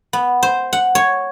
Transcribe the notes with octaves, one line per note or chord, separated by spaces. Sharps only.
B3
C5
F#5
C#5